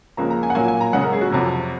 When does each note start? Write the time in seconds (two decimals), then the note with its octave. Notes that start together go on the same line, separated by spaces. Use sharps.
0.17 C#2 C#3 F3 A#3 A#5
0.30 A#5
0.43 G#5
0.50 F#5
0.55 A#2 F#3 A#3 G#5
0.68 G#5
0.81 A#5
0.93 F#2 C#3 G#3 F#5
1.03 A#4
1.13 G#4
1.21 F#4
1.31 F2 C3 F#3